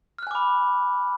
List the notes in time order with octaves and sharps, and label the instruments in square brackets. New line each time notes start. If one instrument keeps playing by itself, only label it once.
[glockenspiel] F6
F#6
G#5
D6
B5